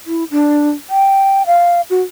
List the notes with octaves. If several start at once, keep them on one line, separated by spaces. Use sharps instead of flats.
E4
D4
G5
F5
F#4